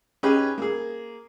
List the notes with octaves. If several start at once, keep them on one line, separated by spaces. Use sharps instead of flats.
C#4 D#4 G4 G#4 B4
A#3 G#4